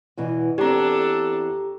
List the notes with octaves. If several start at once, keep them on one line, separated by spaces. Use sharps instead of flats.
E2 B2 E3
E2 C4 D4 G4 A4 A#5